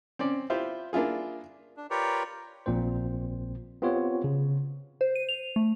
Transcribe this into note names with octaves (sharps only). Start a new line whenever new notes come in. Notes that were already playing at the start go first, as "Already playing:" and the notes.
C4 C#4 D5
E4 F4 G4 C5
A#3 D4 E4 F4 G#4
D4
F4 G4 A#4 B4 C#5 D5
A#1 A#2 C4 C5
B3 C4 F4 G4 C#5
C#3
C5
D#7
F7
A3